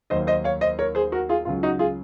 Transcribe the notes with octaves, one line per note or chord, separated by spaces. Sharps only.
D#2 D#3 F#3 A#3 C5 D#5
C5 D#5
C#5 F5
C5 D#5
A#4 C#5
G#4 C5
F#4 A#4
F4 G#4
C#2 C#3 F#3 F4
D#4 F#4
F4 G#4